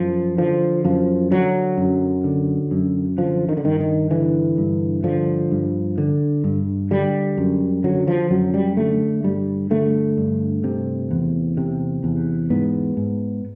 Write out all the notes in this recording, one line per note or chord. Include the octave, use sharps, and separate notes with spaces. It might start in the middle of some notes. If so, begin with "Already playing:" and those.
Already playing: F#2 F3
D3 F3
F#2 F3
D3 F#3
F#2
D3
F#2
D3 F3
D#3
D3
G2 D#3
D#3
D3 E3
G2
D3 F3
G2
D3
G2
D3 G3
F#2
D3 F#3
F3
F#2 F#3
G3
D3 A3
G2 G3
D3 A3
G2
C3
E2
C3
E2
G#2 B3
G#2